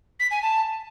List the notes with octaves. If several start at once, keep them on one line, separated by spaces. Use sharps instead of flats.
B6
G#5
A5